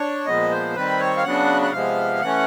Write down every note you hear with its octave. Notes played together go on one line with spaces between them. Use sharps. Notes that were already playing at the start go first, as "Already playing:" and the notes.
Already playing: D4 C#5
A#2 F3 G#3 B3 D#5
C5
D#3 G3 C4 B4
C#5
F5
C#3 F#3 B3 D4 F#5
F#5
C3 F3 G#3 B3 F5
E3 A3 C#4 F#5